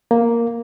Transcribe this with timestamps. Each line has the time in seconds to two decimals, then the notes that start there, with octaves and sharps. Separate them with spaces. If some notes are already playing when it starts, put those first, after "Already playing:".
0.11 A#3